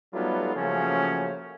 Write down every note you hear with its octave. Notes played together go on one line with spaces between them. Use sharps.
F#3 G3 A3 B3 D#4 F4
C#3 F3 F#3 A3 A#3 C#4